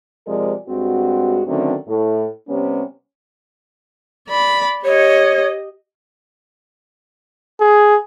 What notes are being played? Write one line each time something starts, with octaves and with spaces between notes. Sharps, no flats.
C3 F3 G#3 A#4 D5
G2 G#3 C4 F#4
D3 D#3 F#3 A3 C4 C#4
A2 A3
C3 G3 B3 C#4
D5 B5
G4 C#5 D#5
G#4